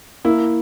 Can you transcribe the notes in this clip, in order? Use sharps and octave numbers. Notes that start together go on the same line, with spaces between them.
A#3 E4